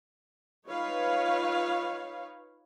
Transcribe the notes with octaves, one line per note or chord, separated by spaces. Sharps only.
D#4 F4 B4 C#5 F5